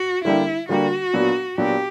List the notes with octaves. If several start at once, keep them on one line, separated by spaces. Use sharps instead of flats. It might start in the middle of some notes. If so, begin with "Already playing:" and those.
Already playing: F#4
D3 G3 A#3 D4 E4 G4
D3 G3 A#3 D4 F#4 G4
A#2 F#3 B3 D4
A#2 F#3 B3 D4 G4